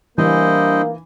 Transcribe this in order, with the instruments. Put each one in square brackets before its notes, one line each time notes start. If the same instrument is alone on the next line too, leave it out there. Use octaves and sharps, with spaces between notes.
[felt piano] E3 [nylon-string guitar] G3 D4 G#5 [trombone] A#3 [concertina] E4 C5 D#5